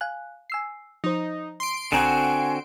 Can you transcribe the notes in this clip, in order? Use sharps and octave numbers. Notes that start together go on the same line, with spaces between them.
F5 G#5 F#6
G#5 E6 C7
F3 D#4 C5
C6 D7
B1 D3 C4 F#4 G#5 A#5